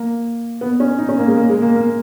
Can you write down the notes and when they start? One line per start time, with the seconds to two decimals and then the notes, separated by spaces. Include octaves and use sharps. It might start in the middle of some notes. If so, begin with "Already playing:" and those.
Already playing: A#3
0.61 B3
0.80 C#4
0.98 D#4
1.09 C#4
1.19 A#3
1.27 G#3
1.37 A#3
1.50 G#3
1.62 A#3
1.76 A#3